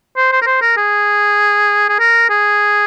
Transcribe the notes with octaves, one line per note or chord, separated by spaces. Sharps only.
C5
C5
A#4
C5
A#4
G#4
G#4
A#4
G#4